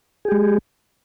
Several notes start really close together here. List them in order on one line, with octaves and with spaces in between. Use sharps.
G#4 G4 G#3